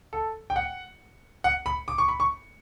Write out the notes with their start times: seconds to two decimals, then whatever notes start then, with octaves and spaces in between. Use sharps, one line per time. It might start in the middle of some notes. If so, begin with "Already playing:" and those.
0.13 A4
0.50 G5
0.56 F#5
1.44 F#5
1.66 B5
1.88 D6
1.98 C#6
2.08 B5
2.20 C#6